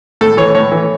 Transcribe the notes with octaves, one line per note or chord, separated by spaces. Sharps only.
A2 A4
E3 C#5
A2 C#5
E3